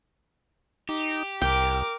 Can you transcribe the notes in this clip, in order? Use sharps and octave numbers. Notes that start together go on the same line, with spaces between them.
D#4 G4
C2 A#4 G5 D6